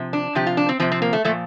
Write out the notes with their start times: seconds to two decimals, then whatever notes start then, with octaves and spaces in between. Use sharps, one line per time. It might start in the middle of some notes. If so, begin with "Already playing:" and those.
Already playing: C3 F3
0.13 D4
0.35 C3 F3 G4
0.47 F4
0.57 D4
0.69 C4
0.80 C3 F3 C4
0.92 C4
1.02 A#3
1.13 A3
1.25 A#2 F3 A3